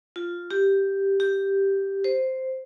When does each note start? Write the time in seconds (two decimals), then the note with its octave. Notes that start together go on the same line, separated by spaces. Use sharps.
0.16 F4
0.51 G4
1.20 G4
2.04 C5